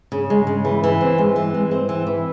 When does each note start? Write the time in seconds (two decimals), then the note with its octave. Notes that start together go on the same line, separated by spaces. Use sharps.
0.12 C#3
0.30 G#3
0.47 C#3
0.65 E3
0.84 E3
1.01 C4
1.18 G#3
1.36 E3
1.54 G#3
1.71 C4
1.89 E3
2.07 E3